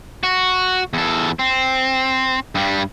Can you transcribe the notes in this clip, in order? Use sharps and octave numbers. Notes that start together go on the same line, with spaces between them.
F#4
E2 A4
C4
G2 G3